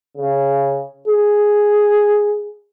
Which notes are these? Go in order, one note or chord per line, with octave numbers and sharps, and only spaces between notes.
C#3
G#4